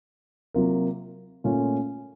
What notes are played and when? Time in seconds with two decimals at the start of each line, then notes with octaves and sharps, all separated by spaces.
0.54 C3 F#3 A#3 F4 A#4
1.44 A#2 A3 C#4 F4